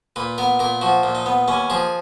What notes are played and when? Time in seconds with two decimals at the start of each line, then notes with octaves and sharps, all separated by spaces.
0.16 A#2 B4
0.38 B3 A#4
0.59 A#2 A#4
0.81 F3 F#4
1.03 A#2
1.15 D#4
1.26 B3
1.48 D#2 C#4
1.70 F3 G#4